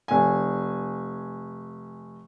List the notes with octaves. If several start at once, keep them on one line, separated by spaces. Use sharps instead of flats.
F1 G#5